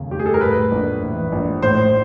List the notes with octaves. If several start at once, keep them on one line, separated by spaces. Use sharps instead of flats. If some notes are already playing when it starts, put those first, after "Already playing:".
Already playing: F1 D#2 C#3
F1 G4
G#4
A4
A#4
A2 B4
A#1
E3
A#1
A2 C5